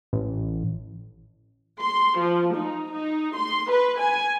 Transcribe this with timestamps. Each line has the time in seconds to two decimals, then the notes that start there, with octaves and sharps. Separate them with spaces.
0.13 A1
1.82 C6
2.19 F3
2.56 D#4
2.91 D#4
3.37 C6
3.72 B4
4.02 G#5